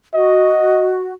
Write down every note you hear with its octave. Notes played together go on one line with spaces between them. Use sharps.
F#4 D#5